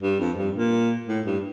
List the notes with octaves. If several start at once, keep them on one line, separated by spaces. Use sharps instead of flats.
G2
F2
G2
A#2
A2
G2